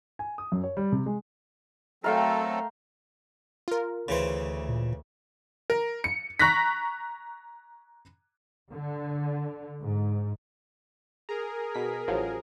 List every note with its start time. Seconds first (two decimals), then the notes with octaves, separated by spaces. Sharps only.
0.19 G#5
0.38 D#6
0.52 F#2
0.63 C#5
0.77 G3
0.92 C3
1.06 G#3
2.04 F#3 A3 C4 A4 A#4 F5 G5
3.68 F4 A#4
4.08 D2 C#3 E3 C5
4.68 A#2
5.70 A#4
6.04 C#7
6.39 A#5 C#6 F#6 A#6 B6
8.73 D3
9.82 G#2
11.29 G#4 A#4 A#5
11.75 B2 B6
12.08 A1 F3 F#3